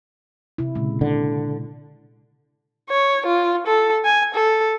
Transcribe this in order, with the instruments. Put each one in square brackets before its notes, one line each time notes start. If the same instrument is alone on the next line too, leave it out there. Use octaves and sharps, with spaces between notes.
[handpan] C3 E4
A#2 C#3 G#3
[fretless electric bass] D3
[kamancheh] C#5
F4
A4
G#5
A4